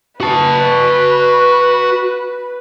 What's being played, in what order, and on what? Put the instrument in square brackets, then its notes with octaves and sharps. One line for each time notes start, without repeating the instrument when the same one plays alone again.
[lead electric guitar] F#4 A5 [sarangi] B4